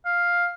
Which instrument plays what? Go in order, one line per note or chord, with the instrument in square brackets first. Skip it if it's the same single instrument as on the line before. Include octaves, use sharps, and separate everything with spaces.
[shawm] F5